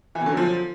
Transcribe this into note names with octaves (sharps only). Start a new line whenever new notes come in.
E3
B2
D3
F#3
F3